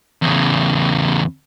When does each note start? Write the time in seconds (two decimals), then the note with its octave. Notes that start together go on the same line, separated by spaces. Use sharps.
0.22 E2 C#3